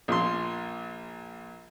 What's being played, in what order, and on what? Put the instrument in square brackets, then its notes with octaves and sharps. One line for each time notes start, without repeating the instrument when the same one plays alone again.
[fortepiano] A#1 A#2 C6